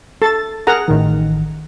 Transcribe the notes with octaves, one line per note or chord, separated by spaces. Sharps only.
A4 A6
G#4 A#4 F#5 A#5
A1 D#3